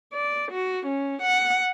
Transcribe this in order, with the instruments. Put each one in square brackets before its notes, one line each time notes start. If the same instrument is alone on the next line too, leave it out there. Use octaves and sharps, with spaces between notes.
[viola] D5
F#4
C#4
F#5